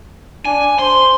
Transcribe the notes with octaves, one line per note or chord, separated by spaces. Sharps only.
D4 G#5
C5 C6